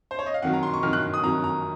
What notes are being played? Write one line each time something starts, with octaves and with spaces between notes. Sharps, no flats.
C5
C#5
D#5
F5
F2 D#3 F#3 F#5
A#5
C6
C#6
F2 D#3 F#3 F6
F#6
D#6
F2 D#3 F#3 A#5
A#5